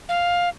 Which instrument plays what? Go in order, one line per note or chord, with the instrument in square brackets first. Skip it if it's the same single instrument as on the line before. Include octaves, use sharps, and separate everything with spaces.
[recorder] F5